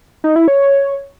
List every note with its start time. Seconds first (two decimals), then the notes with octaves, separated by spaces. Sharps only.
0.24 D#4
0.36 E4
0.48 C#5